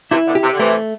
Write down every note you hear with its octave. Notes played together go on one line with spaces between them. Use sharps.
C3 E3 E4
B2 D3
G4
C3
D3
C3 E3 A3